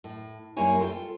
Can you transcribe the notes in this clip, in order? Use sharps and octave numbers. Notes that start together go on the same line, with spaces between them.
A2
F#2 G3 A#3 E4 C#5 G#5
F4 A4 C5 D#5 G5